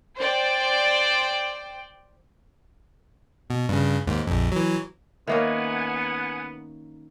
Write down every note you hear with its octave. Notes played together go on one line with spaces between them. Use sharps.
C5 D5 G5
B2
G2 C#3
D#2 G#2
A#1 F2
E3 F#3
D#3 A#3 B3 C#4 E5 F#5 G#5